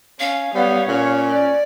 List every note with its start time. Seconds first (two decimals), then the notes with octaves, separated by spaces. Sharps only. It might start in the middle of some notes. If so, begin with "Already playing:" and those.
0.20 C#4 F5
0.55 G3 B3 C#5
0.88 A#2 C#4
1.29 D5